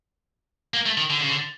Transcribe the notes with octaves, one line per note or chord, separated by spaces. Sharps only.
A#3
A3
D#3
D3
C#3
D3